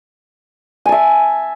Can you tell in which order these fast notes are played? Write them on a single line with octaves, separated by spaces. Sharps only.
G#5 A5 E5